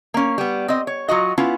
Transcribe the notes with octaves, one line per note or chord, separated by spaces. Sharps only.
A#3 C#4
G3 B3
C4 D#5
C#5
F#3 F4 F#4 D#5
B3 C#4 E4 F4